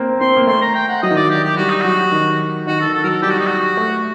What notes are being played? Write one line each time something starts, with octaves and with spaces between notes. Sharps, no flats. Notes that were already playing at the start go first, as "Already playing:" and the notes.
Already playing: A#3 C4
C4 C6
A#3
A3 C6
A#5
G5
F#5
F#3 D#5
D#3
F#3 D5
G4
G4
G3 F#4
D#4
F#3 F#4
D#3
D#3 F#4
A4
D#3
A4
F#3 A4 A#4
G3 G4
F#4
D#4
F#4
A3